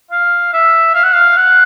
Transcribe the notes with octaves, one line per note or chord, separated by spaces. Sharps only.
F5
E5
F5
F#5
F5
F#5